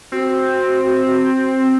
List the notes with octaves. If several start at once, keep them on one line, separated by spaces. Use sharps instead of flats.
C4 F#4